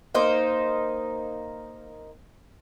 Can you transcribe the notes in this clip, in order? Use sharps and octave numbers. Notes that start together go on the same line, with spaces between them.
A#3 D#4 C5